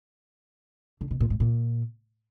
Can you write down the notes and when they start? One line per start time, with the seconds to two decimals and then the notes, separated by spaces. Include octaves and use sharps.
1.01 D3
1.11 B2
1.20 A#2
1.30 G#2
1.40 A#2